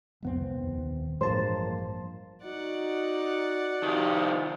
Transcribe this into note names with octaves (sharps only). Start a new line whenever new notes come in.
D#1 C2 F2 G#3 B3 C4
D#2 D#3
A1 G2 F3 G#3 A#3 C5 A5
D#4 F#4 D5 F#5
C3 D#3 F3